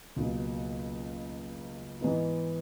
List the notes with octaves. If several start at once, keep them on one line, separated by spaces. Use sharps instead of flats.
C#2 B2 F#3 A#3
G#2 E3 B3 D#4